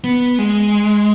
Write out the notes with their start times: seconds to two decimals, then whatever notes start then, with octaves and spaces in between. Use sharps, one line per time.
0.04 B3
0.38 G#3